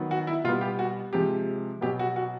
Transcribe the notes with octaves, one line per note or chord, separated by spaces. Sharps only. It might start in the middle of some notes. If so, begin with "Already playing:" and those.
Already playing: D#3 F#3 B3
F#4
E4
B2 G3 B3 F4
G4
F#4
C3 F3 G#3 G4
B2 F#3 B3 G4
F#4
F#4